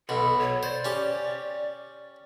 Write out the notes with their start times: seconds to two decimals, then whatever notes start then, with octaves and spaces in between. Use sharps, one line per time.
0.09 B1 B2 A4
0.41 C#5
0.63 C5 D5
0.85 C#4 G4